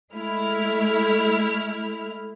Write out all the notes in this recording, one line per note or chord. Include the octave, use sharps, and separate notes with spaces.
G#3 A3 E4 F6